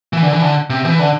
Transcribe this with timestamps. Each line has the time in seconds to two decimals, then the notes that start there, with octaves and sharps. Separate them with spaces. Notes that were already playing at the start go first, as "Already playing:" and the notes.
0.13 E3
0.23 D3
0.33 E3
0.42 D3
0.70 C3
0.85 E3
0.99 D3